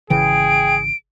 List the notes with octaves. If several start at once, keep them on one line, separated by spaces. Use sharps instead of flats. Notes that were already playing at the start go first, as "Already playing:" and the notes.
G#1 C#3 E3 G#4 G5 D7